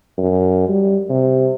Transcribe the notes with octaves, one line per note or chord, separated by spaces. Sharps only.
F#2
G3
C3